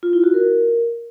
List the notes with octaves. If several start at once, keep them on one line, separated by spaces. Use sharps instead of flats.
F4
E4
F#4
A#4